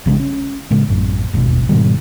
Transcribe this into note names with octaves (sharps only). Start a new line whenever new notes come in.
A#1 C#3 G#3 D4
C#4
A2 C#3 G#3
A1 F#2
D#1 G#1 E2 B2
G#2 B2 D#3 G3